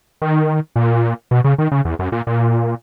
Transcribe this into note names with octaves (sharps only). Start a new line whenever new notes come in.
D#3
A#2
B2
C#3
D#3
C#3
E2
F#2
A#2
A#2